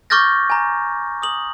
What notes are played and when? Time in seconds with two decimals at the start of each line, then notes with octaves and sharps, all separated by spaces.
0.10 C#6 D6 F6 G6 A6 A#6
0.50 G#5 A#5
1.22 D#6 F#7